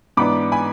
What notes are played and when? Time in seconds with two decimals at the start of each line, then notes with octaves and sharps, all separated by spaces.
0.17 G#2 E3 B3 D4 B5 D6
0.52 G#5 B5